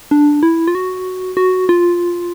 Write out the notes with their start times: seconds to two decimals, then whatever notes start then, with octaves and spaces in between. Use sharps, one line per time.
0.11 D4
0.43 E4
0.68 F4
0.75 F#4
1.37 F#4
1.69 F4